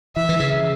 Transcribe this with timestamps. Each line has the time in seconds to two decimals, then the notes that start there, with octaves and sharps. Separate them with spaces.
0.16 E3 E5
0.29 E3
0.40 C#3